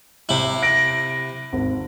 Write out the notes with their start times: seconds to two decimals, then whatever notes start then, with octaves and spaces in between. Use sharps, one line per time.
0.29 C3 E4
0.63 A#6 D7
1.53 G#1